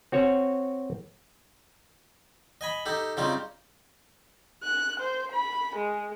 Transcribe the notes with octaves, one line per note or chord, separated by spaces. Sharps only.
C4 F#4 C#5
D#5 G#5 B5
D#4 G4 A4
C#3 G3 C4 D#4 F4
F#6
C5
B5
G#3